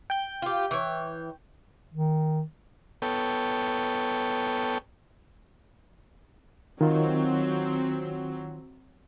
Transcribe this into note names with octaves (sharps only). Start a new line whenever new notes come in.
G5 G6
F4 G4
E3 C#5
D#3
B3 A4 C#5 G5
D#3 F#3 C4 F4